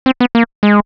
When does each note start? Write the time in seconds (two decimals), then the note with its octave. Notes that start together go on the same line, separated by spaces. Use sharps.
0.06 C4
0.20 B3
0.35 A#3
0.63 G#3